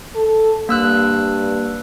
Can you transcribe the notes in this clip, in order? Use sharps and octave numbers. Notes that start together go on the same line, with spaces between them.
A4
G2 A#3 E6 F#6